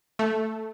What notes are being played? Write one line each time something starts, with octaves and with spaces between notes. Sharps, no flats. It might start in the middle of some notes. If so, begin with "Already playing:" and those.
A3